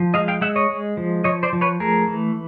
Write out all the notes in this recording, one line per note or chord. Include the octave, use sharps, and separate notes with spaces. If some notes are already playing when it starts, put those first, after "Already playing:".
Already playing: F3
G#3 D#5 F5
F5 G5
G#3 E5 F#5
C#5 D#5
G#3
F3
F3 C#5 D#5
C5 D5
F3
B4 C#5
A3 G#4 A#4
E3